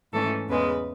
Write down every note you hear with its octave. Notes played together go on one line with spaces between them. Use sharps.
G#2 E3 A3 C#4 A4
E2 C#3 G#3 B4